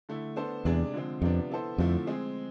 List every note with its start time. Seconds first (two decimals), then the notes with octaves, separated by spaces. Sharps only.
0.09 D3 A3 E4
0.36 B3 D4 A4 C5
0.65 E2 C3 G#3 D4 G#4 D5
0.94 D3 F3 G#3 C4
1.22 F2 C3 F3 B3 D4
1.51 B3 E4 A4 C5
1.78 F2 D3 F3 A3 C4 E4
2.07 G#3 C4 G#4